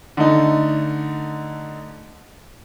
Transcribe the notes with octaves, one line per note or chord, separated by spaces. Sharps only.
D3 A3 D#4